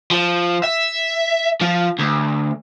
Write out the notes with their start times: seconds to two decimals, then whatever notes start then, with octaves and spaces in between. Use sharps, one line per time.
0.11 F3
0.64 E5
1.61 F3
1.99 D2